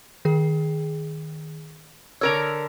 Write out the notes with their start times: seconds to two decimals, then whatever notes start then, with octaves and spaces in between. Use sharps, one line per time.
0.25 D#3 G#4
2.21 D3 A#4 C#5 E6 F6 F7